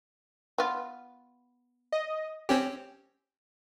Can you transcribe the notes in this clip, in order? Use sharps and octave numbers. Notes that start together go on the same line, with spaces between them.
B3 F4
D#5
C4 C#4 G4